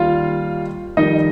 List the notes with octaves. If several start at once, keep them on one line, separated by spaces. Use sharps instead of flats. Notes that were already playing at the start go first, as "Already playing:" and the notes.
Already playing: D#2 D#3 G3 F4 F5
F2 D#3 G3 D#4 D#5